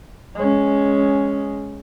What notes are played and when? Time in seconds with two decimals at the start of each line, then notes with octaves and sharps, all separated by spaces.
0.36 G#3 C#4